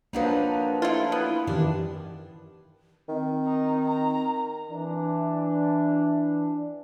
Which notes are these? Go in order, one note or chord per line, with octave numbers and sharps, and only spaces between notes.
F3 F#3 A#3 D4 D#4 B4
A3 E4 F4
B3
F#2 D#3 E3 D4 G4
D#3 C4
D#4
A#5
E3 D4